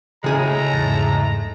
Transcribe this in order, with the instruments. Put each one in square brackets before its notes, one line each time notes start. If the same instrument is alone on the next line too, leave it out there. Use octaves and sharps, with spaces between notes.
[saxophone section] A2 G#3 A3 [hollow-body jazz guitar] C#3 G#4 G#5 [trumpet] A#5
[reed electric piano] E2 G#2 A6